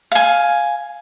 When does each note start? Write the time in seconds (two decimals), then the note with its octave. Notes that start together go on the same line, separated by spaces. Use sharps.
0.12 F5 G#5